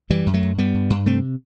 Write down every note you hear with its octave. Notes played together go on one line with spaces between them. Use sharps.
F#2 E3 G3
F#2
F#3 A3
F#2
G2 G3 B3
G2
G2
C3 A3 C4